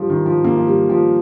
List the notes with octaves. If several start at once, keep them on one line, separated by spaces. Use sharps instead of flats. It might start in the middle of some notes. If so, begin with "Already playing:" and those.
Already playing: F3 G3
D#3
F3
A#3
F3
G3
F3